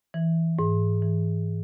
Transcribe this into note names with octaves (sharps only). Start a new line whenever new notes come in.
E3
G#2
E3